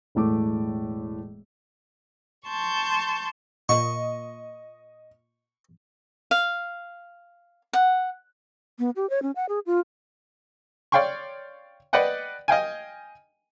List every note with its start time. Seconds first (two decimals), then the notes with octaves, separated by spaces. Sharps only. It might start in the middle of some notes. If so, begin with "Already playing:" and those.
0.15 E1 A2 A3 D6
2.48 A5 C6 C#6 G6
3.69 A#2 A#3 D#5 C#6
6.31 F5
7.73 F#5
8.78 B3
8.96 G4
9.10 C#5
9.22 C#4
9.36 F#5
9.49 G#4
9.66 F4
10.92 C#5 D5 F5 G5 C6 C#6
11.93 B4 D5 D#5 F#5 G5
12.48 D#5 F5 G5 G#5